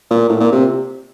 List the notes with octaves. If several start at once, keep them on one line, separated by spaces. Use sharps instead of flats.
A#2
A2
A#2
C3